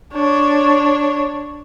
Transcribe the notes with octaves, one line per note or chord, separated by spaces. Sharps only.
D4 C#5